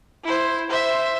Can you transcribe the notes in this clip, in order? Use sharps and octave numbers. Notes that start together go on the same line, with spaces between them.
E4 C5
C5 E5